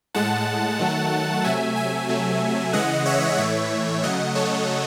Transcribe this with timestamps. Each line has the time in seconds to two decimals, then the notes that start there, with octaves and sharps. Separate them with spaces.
0.14 A2 G#3 F#5 A5
0.79 D#3 F#3 A3
1.44 C3 F#3 A3 E5 G#5
1.76 E5 G#5
2.09 C3 F#3 A3
2.73 C#3 E3 G#3 D#5 F#5
3.06 C#5 E5
3.38 A2 E3 A3 C#5 E5
4.03 C#3 F#3 A3 D#5 F#5
4.35 A4 C#5